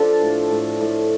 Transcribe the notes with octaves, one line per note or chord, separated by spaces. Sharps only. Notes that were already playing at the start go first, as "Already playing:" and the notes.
Already playing: F3 D4 F4 A4
A2
A2
A2